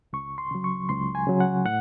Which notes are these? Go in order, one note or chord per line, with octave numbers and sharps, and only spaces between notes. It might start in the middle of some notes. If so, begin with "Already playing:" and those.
C#2 C#6
C6
C#3 F#3
C#6
C#2 C6
G#5
C#3 F#3
F#5
A2 F#5